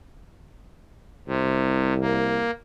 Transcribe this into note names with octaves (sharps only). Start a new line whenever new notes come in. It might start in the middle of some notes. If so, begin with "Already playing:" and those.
C2 C3
A#3